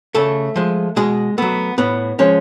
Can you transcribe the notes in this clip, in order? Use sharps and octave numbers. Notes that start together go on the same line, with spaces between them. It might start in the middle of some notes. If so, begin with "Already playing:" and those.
C#3 A3 A4
F3 G#3
B2 G#3 G#4
F#3 A3 B3
A2 B3
F3 G#3 C#4